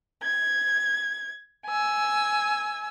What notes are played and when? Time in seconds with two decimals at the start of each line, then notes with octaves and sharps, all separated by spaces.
0.22 G#6
1.66 G#5 E6